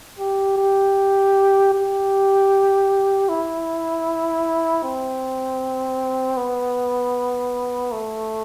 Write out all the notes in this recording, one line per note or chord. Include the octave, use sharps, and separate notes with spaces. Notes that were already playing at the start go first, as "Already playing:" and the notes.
G4
G4
G4
E4
C4
B3
A3